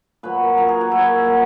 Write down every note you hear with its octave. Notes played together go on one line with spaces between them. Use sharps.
A#2 F#3 B4
A#2 F#3 A#4
G#4
F#4
A#2 F#3 E4
A#2 F#3